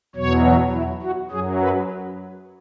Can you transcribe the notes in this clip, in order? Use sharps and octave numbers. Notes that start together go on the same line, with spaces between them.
E2 B2 F#3 C#5
E4
F#4
F#2 F#3 G#4
B4